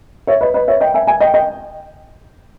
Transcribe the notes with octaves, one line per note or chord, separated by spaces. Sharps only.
C#5 E5
B4 D#5
B4 D#5
C#5 E5
D#5 G5
E5 G#5
E5 G#5
D#5 G5
D#5 G5